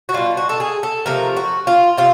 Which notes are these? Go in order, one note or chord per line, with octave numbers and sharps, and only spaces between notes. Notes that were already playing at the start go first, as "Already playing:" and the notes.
F#4
B2 G3 F4
F#4
A4
G#4
A4
C3 F3 A3 A#4
F#4
F4
C3 F4